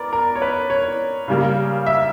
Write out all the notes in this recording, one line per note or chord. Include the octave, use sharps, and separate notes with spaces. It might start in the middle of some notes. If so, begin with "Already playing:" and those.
Already playing: B3 A#4 D5
A#4
C#5
B4
C#5
C#3 G3 A#3
E5